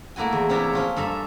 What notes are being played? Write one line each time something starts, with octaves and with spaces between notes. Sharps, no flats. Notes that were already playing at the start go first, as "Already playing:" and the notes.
A3 A#3 E4 F#4 G#5
E2
C3 C#4 D4 E4 C#5
F3 C#4 F4
G2 A4 E5 A#5